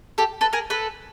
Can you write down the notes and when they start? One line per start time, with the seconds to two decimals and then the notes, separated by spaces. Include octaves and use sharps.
0.18 G4 A4
0.41 A4 B4
0.53 G#4 A#4
0.70 A4 B4